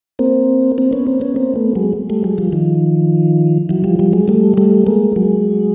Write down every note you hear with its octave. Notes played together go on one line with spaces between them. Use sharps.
A#3 C4
A#3 C4
B3 C#4
A#3 C4
B3 C#4
A#3 C4
A3 B3
F#3 G#3
G3 A3
F#3 G#3
F3 G3
D#3 F3
E3 F#3
F3 G3
F3 G3
F#3 G#3
G3 A3
G3 A3
G#3 A#3
F#3 G#3